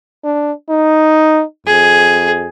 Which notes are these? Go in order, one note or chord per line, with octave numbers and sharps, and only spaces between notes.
D4
D#4
F2 G#4